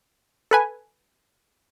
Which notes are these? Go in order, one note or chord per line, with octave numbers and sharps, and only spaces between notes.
A4 B4 G#5